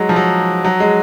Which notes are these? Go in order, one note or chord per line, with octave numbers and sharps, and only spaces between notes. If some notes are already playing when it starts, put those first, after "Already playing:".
Already playing: F#3 G#3
F3
F#3
F#3
G#3